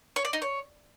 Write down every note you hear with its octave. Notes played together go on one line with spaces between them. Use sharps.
C#5
D5
D#4
C#5